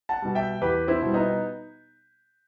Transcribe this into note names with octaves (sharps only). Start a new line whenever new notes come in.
F#5 A5
B2 G3
E5 G5
E2 G4 B4
C4 E4
B2 G3
B3 D#4